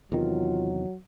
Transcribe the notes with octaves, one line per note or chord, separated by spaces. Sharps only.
E2 C3 D#3 F#3 F4